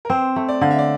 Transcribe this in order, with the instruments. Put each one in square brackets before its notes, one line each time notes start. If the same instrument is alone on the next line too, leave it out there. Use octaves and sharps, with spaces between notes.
[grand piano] A#4
[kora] C4 [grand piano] C5
[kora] A3
[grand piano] D5
[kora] D3 [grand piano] F5
[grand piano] E5
D5